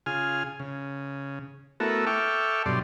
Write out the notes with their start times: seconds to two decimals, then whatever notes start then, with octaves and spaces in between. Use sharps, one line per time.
0.06 C#3 F4 G#4 G#5 F6
0.60 C#3
1.80 A3 B3 E4 F#4 A4 A#4
2.06 A4 E5 G5 C#6 D6 F6
2.66 G2 B2 F#3 G4 D5 C6